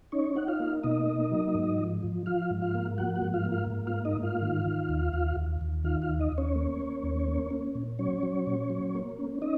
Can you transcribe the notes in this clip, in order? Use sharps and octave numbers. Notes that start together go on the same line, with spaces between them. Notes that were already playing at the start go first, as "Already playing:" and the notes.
C#4 D#4 C#5
D#4 F#5
F4 F5
A#3
B2 D#4 D#5
A#3
F#3
G#2
F3
F3
F3 F4 F5
G#2
F4 F5
A#3
F3 F#4 F#5
F#4 F#5
G#2
F4 F5
A#3
F4 F5
G#2
F4 F5
A#3
D#4 D#5
G#2
F4 F5
D#3
D#3
D#2
D#2
D#2
D#2
D#3 F4 F5
F4 F5
D#2
D#4 D#5
D#2
C#4 C#5
A#3
A#3
D#2
A#3
C#4
A#2
F#3 C#4 C#5
F#3
A#2
F#3
A#3
C#4
C#4 D#4 D#5